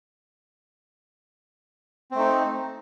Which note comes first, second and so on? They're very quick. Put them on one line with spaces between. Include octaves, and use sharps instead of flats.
C4 A3 D#4